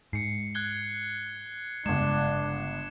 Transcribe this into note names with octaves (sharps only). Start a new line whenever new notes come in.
G#2 C7 C#7
F#6 G#6 G7
G1 C#3 G#3 D4 G#6 E7